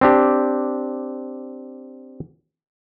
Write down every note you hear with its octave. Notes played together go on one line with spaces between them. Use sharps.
C4 D4 G4